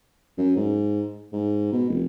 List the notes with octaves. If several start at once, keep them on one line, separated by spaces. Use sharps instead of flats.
F#2
G#2
G#2
B2
F1